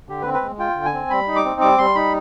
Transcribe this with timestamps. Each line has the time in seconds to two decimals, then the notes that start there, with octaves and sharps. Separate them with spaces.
0.09 D3 G4
0.22 B4
0.25 C4
0.34 B4
0.42 G#3
0.59 F4 G5
0.77 D3
0.85 G#5
0.93 C4
1.10 G3 B5
1.28 D#4
1.36 D6
1.45 C4
1.61 G3 D6
1.78 G3 C6
1.95 D#4 B5